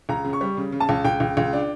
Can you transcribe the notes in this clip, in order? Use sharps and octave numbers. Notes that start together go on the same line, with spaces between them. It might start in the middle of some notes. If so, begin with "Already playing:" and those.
C#2 A#5
C#3
C#6
G3
C#3
C#3
A5
C#2
C#2 G5
C#2
C#2
D4